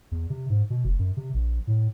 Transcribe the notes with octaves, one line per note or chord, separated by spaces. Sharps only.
E2
C3
G#2
B2
F1
F#2
C3
A#1
A2